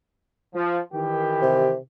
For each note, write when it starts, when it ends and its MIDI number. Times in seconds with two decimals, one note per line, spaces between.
0.55 0.80 53
0.94 1.73 51
0.94 1.73 52
0.94 1.73 67
1.42 1.78 48